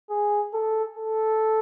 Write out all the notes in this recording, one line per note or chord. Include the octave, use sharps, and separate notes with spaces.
G#4
A4
A4